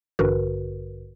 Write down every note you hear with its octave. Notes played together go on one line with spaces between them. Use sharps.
A1 G2 D3 F#4 A#4 B4